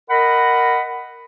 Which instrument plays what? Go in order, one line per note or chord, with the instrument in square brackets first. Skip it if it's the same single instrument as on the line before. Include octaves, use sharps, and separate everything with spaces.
[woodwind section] A#4 D#5 F#5 B5